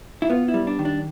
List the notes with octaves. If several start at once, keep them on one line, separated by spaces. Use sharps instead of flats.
E4
B3 F4
E4
G3
D4
D#3
D4